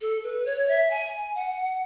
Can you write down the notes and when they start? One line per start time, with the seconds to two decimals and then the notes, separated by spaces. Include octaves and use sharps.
0.01 A4
0.23 B4
0.46 C#5
0.69 E5
0.91 G#5
1.35 F#5